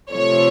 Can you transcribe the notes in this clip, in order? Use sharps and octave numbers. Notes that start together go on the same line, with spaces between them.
C3 F3 A3 C#5